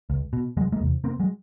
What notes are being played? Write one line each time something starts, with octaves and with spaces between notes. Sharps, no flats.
C#2
B2
F1 F#3 G#3
G#3 A#3
E2 C3
F1 A#3 C4
F#3 G#3